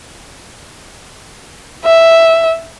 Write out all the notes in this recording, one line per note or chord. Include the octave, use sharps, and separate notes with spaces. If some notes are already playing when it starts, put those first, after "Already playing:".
E5